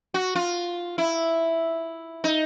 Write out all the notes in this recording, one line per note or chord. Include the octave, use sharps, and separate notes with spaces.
F#4
F4
E4
D#4